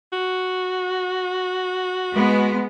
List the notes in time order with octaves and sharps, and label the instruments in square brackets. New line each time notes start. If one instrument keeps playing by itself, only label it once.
[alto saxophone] F#4
[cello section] G#3 B3